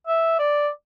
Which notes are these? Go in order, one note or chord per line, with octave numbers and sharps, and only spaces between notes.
E5
D5